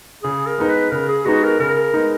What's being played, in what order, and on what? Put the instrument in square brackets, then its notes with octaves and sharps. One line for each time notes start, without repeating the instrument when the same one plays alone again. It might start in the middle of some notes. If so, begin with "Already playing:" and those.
[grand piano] C#3 [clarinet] G#4
[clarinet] A#4
[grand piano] G#3 B3 D#4
[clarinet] B4
[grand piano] C#3 [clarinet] A#4
[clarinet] G#4
[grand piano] G#3 B3 D#4 [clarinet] F#4
[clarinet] A#4
[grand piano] C#3 [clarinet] A#4
[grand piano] G#3 B3 D#4